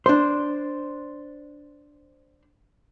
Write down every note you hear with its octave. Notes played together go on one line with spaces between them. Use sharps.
D4 C5